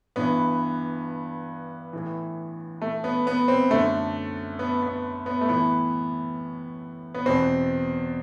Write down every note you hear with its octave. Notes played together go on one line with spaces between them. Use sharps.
G2 E3 B3
A2 E3
A3
B3
B3
C4
F#2 D3 A3
B3
B3
B3
A3
A2 E3 B3
B3
E2 B2 C4